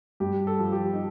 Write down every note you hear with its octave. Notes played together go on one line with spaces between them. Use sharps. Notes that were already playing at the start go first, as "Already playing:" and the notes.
G2 G4
A4
F3
G4
D#4